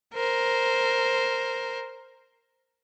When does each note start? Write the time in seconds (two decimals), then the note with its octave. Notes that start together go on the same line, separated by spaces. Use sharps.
0.14 A#4 C5